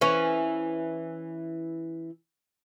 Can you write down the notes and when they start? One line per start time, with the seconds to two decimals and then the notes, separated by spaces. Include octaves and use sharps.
0.01 E3 C#4